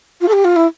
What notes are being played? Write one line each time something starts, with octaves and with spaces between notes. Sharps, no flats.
F4
A4
G4
F4
E4